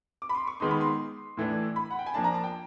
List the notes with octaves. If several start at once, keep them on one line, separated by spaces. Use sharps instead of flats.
D6
B5
C6
C#6
D#3 G#3 B3 D#4 C6
B5
C6
A2 E3 A3 D4
B5
F#5
G5
G#5
F3 A#3 D4 A5
A#5
A5
G5